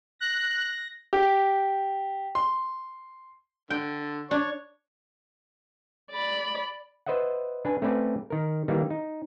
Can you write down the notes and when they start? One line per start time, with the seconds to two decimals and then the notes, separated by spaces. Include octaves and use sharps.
0.20 F#6 A#6
1.13 G4
2.35 C6
3.70 D3 G5
4.31 D4 C#5 C#6
6.11 D5 B5
7.06 B4 C5 D#5 E5 F#5
7.65 D4 B4 G#5
7.82 A3 C4 C#4 B4 D5
8.30 D#3 A#4
8.68 D#3 E3 G3 A#3
8.90 D#4